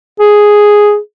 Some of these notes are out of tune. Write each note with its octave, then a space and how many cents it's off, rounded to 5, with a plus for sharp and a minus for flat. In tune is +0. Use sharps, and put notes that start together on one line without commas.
G#4 +0